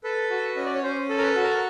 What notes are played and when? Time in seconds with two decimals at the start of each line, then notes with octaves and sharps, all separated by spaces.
0.04 A4 B4
0.30 F#4
0.56 C#4 D#5
0.65 D5
0.74 C#5
0.83 C#4 C5
1.09 A4
1.18 A#4
1.23 B4
1.36 F#4
1.43 A#4